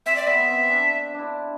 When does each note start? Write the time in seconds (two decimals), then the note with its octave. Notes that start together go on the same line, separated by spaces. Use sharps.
0.06 C4 E5
0.16 D5
0.27 B3 E5
0.39 B3
0.49 C4
0.70 D4
1.14 D4 E4